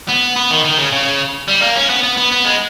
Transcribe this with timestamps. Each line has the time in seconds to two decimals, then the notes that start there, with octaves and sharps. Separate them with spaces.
0.09 B3
0.36 B3
0.50 D#3
0.65 D#3
0.78 C#3
0.92 C#3
1.48 G3
1.62 A#3
1.76 C#4
1.89 B3
2.03 B3
2.17 B3
2.32 B3
2.45 G#3